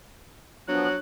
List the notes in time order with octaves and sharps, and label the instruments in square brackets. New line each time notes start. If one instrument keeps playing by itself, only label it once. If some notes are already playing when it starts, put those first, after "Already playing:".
[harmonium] F3 B3 [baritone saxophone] F#3 [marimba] D4 [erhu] F#6